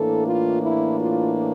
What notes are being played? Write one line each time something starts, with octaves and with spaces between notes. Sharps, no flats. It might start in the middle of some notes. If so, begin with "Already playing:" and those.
Already playing: A2 E3 A#3 D4 A4
F4
E4
F4